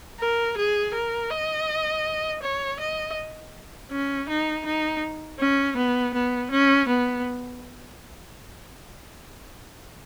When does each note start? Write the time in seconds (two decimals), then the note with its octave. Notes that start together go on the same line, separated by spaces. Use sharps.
0.19 A#4
0.57 G#4
0.94 A#4
1.30 D#5
2.42 C#5
2.80 D#5
3.91 C#4
4.29 D#4
4.65 D#4
5.39 C#4
5.77 B3
6.13 B3
6.51 C#4
6.88 B3